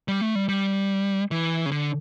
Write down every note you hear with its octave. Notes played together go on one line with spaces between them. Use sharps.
G3
A3
G3
G3
E3
C#3
D3